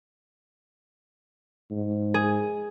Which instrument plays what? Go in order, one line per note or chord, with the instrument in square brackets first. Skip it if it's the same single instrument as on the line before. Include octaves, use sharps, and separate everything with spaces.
[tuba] G#2
[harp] G#4